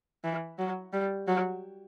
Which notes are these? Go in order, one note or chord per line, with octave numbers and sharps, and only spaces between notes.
E3
F#3
G3
F#3